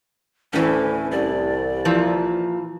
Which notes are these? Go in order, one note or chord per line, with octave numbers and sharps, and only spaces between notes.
D2 A2 E3 C#4
C2 D5
A#2 E3 F3